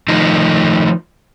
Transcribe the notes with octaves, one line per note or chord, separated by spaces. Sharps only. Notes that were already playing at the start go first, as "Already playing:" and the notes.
D#3 F3 A3 D#4